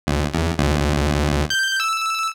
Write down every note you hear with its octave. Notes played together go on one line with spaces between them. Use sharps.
D2
E2
D2
G6
E6